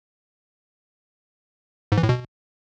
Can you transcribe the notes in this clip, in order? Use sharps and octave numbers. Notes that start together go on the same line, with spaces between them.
G#2
E3
A2
B2